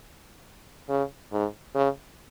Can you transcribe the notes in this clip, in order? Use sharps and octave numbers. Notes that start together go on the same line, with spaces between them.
C#3
G#2
C#3